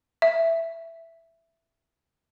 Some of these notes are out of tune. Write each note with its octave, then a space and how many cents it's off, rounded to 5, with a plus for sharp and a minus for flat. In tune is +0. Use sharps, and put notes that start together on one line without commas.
E5 +5